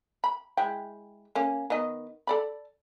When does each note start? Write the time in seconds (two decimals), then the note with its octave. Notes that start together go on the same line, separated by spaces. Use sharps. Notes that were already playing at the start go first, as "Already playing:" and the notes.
0.24 B5
0.57 G#3 E4 G5
1.35 A#3 C#4
1.70 D#3 B3 D#5
2.27 A4 D5 B5